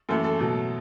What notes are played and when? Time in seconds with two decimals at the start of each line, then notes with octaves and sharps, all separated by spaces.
0.09 F#2 E3 A3 A4
0.24 A4
0.39 B2 F#3 A3